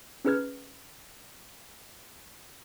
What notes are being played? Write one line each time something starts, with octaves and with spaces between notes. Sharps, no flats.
C#4 D#4 G#4 B4 F6 G#6